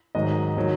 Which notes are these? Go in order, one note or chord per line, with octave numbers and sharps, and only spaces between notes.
G#2 D#3 F#3 D#5
D#3 F#3